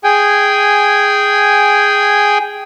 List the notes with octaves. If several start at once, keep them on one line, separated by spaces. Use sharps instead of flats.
G#4 G5 G#5